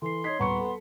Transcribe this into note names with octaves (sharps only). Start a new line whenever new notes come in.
E3 A4 C6 C7
D#4 C#5 G#6 B6 C7
D#1 B3 A#5 C#6 C#7
A4